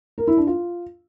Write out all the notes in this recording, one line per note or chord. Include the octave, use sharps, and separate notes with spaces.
A#4
E4
D4
F4